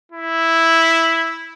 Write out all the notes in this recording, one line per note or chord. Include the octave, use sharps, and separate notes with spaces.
E4